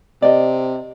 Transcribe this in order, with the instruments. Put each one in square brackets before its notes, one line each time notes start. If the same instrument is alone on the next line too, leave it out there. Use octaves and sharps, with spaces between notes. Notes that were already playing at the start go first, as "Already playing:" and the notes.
[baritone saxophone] C3 [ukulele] D5 D#5